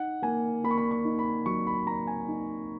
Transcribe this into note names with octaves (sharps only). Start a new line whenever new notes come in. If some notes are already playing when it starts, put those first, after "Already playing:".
Already playing: D#4 F#5
A#3 G#5
A#3 B5
C#6
B5
C#6
D#4
B5
F#3 C#6
B5
A#3 A#5
G#5
D#4